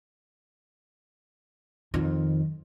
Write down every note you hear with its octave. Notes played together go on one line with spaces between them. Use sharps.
F2 D#3